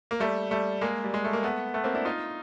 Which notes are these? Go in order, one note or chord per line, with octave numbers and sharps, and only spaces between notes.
A#3
G3 A3
G3 A3
G#3 A#3
G3
G#3
A3
A#3
A3 B3
A3 B3
A#3 C4
D4 E4
D#4 F4